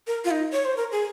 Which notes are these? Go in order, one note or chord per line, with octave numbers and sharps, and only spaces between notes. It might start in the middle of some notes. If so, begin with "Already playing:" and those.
A#4
F4
D#4
C#5
C5
A#4
G#4